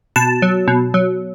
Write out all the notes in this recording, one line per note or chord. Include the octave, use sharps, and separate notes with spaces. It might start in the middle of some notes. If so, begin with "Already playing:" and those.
B2 A5
F#3
B2
F#3